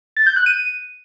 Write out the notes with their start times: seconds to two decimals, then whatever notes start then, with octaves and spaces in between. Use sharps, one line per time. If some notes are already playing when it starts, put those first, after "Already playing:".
0.17 A6
0.26 G6
0.36 F#6
0.46 D#7